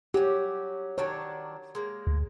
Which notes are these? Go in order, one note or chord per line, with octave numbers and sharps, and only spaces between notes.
F#3 C#4 G4
D#3 F#3 D4 C#5
G#3 A#3
D2